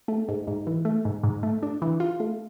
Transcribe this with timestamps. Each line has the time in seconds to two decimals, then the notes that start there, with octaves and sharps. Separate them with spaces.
0.08 A3
0.29 G#2
0.47 G#2
0.67 E3
0.85 A3
1.05 G#2
1.24 G#2
1.43 A3
1.63 D4
1.82 E3
2.00 F4
2.20 A3